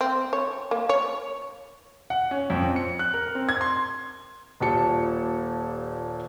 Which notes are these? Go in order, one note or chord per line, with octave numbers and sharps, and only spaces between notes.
C4
C#5
A#3
C#5
F#5
C#4
F2
C4
C#7
F#6
A#4
C4
G#6
C6
D#1 A#2 G4 A5 C#7